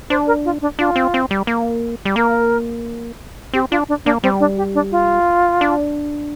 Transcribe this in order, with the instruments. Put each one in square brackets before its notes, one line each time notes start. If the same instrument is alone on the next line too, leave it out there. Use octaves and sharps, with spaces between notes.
[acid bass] D4 [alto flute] C5
[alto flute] A#4
F4
D4
[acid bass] D4 [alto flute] F4
[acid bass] C4
C4
G3
A#3
G3
[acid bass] A#3 [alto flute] A#4
[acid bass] C4 [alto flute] G4
[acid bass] D4 [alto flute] F4
[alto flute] D4
[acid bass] A#3 [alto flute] D4
[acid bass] G3 [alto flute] C4
[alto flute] D4
G4
D4
F4
[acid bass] D4